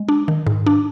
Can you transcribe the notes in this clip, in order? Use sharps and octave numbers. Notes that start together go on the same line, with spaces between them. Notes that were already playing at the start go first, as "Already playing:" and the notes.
Already playing: G#3
D4
D#3
G#2
D4